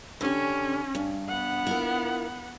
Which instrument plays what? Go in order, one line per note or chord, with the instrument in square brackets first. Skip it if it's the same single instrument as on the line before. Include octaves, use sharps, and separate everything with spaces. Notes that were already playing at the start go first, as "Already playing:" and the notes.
[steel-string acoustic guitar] D3 G4 [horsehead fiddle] C#4
[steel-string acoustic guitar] G2
[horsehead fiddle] B3 F#5
[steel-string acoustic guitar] E4 F4 A#4